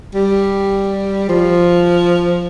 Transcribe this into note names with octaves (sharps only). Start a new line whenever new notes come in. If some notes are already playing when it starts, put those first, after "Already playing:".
G3
F3